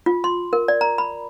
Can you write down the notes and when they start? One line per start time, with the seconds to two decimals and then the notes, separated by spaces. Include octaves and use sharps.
0.06 F4
0.24 C6
0.53 A#4
0.68 D5
0.81 A#5
0.98 B5